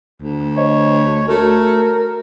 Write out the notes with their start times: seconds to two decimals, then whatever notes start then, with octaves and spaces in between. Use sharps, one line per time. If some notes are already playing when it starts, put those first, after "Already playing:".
0.22 D2
0.57 C5 C#5 D#5
1.28 A3 F#4 A4 A#4